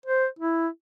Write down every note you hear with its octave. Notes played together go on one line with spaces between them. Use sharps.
C5
E4